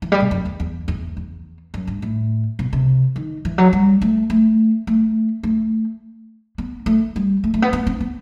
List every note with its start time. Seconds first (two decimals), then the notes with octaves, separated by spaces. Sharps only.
0.02 E3
0.12 G3
0.20 B2
0.31 F#2
0.45 E2
0.60 E2
0.88 E2
1.17 E2
1.74 F#2
1.87 G2
2.02 A2
2.59 B2
2.73 C3
3.16 D#3
3.45 E3
3.58 F#3
3.73 G3
4.02 A3
4.30 A3
4.87 A3
5.43 A3
6.58 B3
6.86 A3
7.16 G3
7.44 A3
7.54 A3
7.62 B3
7.73 B3
7.87 C4
8.00 B3